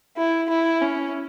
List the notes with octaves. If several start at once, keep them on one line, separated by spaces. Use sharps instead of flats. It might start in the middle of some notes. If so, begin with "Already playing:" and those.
E4
E4
C#4